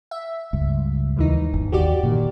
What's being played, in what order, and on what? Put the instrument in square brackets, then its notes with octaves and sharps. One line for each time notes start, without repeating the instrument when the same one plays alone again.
[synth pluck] E5
[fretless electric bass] C#2 G2
[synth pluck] D#2 E3 D#4
[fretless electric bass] G1
[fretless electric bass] D#2 [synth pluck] F#4 G4 D5
[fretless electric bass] A#2 D3 D#3